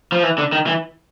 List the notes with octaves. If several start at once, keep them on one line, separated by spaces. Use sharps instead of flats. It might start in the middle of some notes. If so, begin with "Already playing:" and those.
F3
E3
D3
D#3
E3